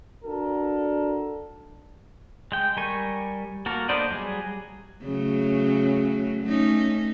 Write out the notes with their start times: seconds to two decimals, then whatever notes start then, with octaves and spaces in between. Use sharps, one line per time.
0.24 D4 F#4 A4 A#4
2.52 G#3 G5
2.77 G3 A#4 G#5 C#6
3.66 A#3 F#4 A4 A#4
3.89 B3 D4 C5 D5 D#5
4.11 F#3 G3 G#4
5.02 C#3 F#3 A3
6.43 A3 C#4 D#4